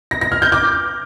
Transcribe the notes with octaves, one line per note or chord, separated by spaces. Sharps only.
A#6
A#6
F6
G6
D6